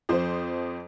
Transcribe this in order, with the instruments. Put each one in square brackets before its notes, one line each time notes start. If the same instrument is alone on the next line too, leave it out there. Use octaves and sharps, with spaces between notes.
[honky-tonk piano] F2 F3 C5